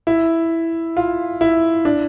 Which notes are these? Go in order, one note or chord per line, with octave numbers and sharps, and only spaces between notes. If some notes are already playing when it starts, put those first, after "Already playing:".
E4
F4
E4
D4